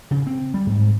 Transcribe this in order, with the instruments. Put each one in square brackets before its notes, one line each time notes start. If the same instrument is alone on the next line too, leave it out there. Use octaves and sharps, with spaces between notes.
[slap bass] C#3
C4
G3
G#2